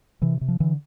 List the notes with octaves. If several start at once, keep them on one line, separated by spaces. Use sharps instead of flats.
C3 E3
C3
F3
D3 E3